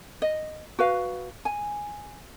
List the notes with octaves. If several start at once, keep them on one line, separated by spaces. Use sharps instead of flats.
D#5
F#4 B4 F5
G#5